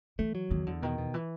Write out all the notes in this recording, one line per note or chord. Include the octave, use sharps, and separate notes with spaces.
E3 A3
F#3
E2 D#3
E2 D3
B2 D#3
B2
E3